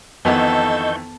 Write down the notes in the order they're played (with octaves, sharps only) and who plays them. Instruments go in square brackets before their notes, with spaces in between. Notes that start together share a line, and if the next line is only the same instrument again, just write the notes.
[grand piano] F2 D#3 E3 [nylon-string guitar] B3 [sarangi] A4 [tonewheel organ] D#5 C#6 G6